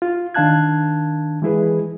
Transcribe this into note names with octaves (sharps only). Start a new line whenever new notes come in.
F4
D#3 D4 F5 A5 F#6 G#6
E3 G#3 E4 G#4 B4